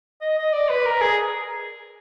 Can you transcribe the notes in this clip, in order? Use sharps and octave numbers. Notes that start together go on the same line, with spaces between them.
D#5
D#5
D5
B4
A#4
G#4